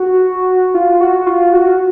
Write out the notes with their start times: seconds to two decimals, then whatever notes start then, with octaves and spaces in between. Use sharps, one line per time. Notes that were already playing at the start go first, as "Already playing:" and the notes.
Already playing: F#4
0.74 F4
1.01 F#4
1.26 F4
1.53 F#4